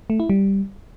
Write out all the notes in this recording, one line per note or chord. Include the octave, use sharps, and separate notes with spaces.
A3
E4
G3